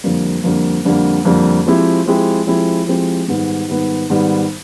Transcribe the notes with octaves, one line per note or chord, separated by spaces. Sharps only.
F2 D3 G3 A#3
F2 D3 G3 A#3
F2 D3 G3 A#3
F2 D3 G3 A#3
F3 G#3 C4 E4 G4
F3 G#3 C4 E4 G4
F3 G#3 C4 E4 G4
F3 G#3 C4 E4 G4
G#2 D#3 G3 B3
G#2 D#3 G3 B3
G#2 D#3 G3 B3